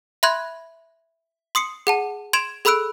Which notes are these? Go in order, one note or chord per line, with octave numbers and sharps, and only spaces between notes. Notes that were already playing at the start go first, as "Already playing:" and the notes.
E5 B5 C6 F#6 G#6
C6 D#6 C7 C#7
G#4 F#5 A5
C6 G#6 D7 E7 F7
G#4 A4 B5 E6 F#6 D7